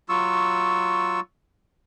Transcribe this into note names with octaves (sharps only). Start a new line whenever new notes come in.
F#3 F4 C#6 E6